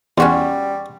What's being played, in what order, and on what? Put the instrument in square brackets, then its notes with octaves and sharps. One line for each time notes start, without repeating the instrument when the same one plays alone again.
[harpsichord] E2 [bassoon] G3 [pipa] C#4 F#4 C6